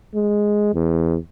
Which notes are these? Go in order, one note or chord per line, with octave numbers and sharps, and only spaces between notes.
G#3
E2